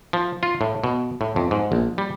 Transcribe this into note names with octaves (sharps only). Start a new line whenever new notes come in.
F3
F4
A2
B2
A2
F2
G#2
A#1
G3